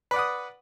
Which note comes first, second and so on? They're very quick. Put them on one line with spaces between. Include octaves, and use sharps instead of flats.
B4 D5 F#5 D#6